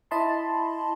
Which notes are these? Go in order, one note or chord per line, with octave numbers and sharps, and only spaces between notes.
E4 D#5 A5 B5 C6